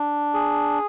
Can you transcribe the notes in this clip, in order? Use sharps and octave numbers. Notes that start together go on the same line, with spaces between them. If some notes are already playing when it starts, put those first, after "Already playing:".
Already playing: D4
G#4